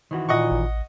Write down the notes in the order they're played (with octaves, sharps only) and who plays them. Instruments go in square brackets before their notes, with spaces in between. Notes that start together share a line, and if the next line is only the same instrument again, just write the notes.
[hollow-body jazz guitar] D#3 E3 F#4
[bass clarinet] A#2 [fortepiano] D#5 F#5 C#6
[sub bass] A1